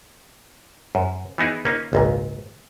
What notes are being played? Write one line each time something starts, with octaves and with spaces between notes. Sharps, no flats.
F#2
E3 B3 D#4 E4 G#4
A#3 C#4 D#4 F4
G#1 C#2 A#2